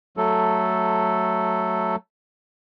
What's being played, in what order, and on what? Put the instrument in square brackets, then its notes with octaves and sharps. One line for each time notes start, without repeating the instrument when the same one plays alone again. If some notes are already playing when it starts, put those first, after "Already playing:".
[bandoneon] F#3 A3 A4